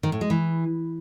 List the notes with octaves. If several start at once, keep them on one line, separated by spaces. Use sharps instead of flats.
D#3
A2
G#3
E3